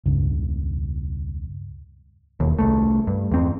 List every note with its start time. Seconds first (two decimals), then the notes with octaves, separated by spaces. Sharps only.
0.06 E1 C#2 G2 C#3
2.40 E1 D#2
2.59 C2 A3
3.07 G2
3.32 E2 C4